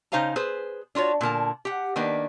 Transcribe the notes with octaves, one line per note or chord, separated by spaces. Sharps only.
C#3 D#4 C5 F5 G#5 A#5
G#4 B4 C5
D4 F4 F#4 C#5
A#2 D3 A#4 A5
G4 F#5
D#3 A#3 D4 B4